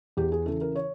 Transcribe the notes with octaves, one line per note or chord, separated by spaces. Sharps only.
E2 G4
G#4
C#3 E3 A4
A#4
C#5